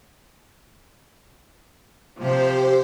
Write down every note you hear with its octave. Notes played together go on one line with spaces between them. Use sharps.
C3 F3 G4 C5